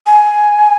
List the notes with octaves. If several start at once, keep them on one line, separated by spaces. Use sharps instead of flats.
G#5